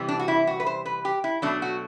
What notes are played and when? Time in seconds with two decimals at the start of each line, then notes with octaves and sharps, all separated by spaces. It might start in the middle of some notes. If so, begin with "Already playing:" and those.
Already playing: C3 E3 G3
0.08 D4
0.19 F#4
0.28 E4
0.47 F#4
0.60 B4
0.66 C5
0.85 B4
1.05 G4
1.24 E4
1.42 B2 F#3 A3 D4
1.62 F#4